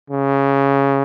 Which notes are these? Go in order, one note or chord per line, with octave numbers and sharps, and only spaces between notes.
C#3